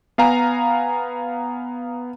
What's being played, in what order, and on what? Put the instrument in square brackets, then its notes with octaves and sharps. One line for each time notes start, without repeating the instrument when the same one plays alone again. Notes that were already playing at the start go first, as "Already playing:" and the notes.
[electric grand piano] B3 F5 G#5 A#5